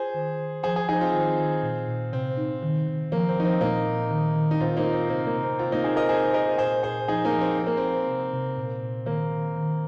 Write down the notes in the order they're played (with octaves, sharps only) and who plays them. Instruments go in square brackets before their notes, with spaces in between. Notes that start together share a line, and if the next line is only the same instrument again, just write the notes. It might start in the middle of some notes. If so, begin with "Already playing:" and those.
Already playing: [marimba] F4 [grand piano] G#4 C5
[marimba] D#3
D#3
[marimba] F3 [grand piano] G#4 C5
[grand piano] G#4 C5
[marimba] F3 [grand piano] D#4 G#4
[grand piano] C4 F4
[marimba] D#3
D#3
A#2
A#2
[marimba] C3 [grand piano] C4
[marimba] D#4
D#3
D#3
[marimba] F3 [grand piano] A#3
[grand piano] C4
[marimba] F3 [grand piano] D#4
[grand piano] C4
[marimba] A#2 [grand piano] A#3 D#4
[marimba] A#2
D#3
D#3
[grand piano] D#4
[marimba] A#2 [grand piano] C4 F4
[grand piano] A#3 D#4
[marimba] F4
[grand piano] C4
[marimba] C3 [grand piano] A#3
[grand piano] A#3
[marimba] C3
[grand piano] C4
[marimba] C3 [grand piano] C4 F4
[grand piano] A#3 D#4
[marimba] D#4 [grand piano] G#4 C5
[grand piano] A#4 D#5
[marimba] C3 [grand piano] G#4 C5
[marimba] F4 [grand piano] A#4 D#5
[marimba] A#2 [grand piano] G#4 C5
[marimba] A#2 [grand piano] G#4 C5
[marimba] F3 [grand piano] D#4 G#4
[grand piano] A#3 D#4
[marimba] F3
[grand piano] C4
[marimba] F3 [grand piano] C4
[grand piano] A#3
[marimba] F3 [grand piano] C4
[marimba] C3
C3
A#2
A#2
[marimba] D#3 [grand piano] A#3
[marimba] D#3
D#3